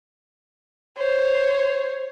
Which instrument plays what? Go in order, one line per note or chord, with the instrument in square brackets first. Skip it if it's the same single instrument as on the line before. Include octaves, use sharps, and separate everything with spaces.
[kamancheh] C5 C#5